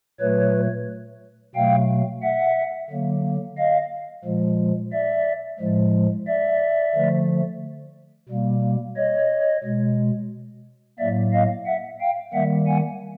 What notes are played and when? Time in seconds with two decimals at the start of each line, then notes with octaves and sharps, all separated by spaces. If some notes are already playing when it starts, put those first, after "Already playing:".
0.20 A#2 F#3 A3 B4 C#5
1.55 B2 F#3 A3 F5 G5
2.22 E5 F#5
2.90 D3 F#3 A#3
3.57 D#5 F5
4.25 A#2 F3 G#3
4.92 D5 E5
5.59 A2 F3 G#3
6.27 D5 E5
6.95 D3 F3 A3
8.29 B2 G3 A#3
8.97 C#5 D#5
9.64 B2 G#3
10.99 A2 F#3 A#3 D5 E5
11.32 D#5 F5
11.66 E5 F#5
12.00 F5 G5
12.34 D#3 G3 A#3 E5 F#5
12.67 F#5 G#5